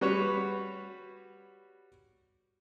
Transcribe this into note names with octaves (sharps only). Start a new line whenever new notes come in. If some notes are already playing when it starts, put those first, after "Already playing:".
G3 F#4 B4 C#5